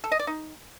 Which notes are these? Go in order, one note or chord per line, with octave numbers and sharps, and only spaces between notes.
A4
D#5
D5
D#4